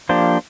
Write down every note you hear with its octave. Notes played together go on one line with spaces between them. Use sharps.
F3 A#3 D4 G4 C5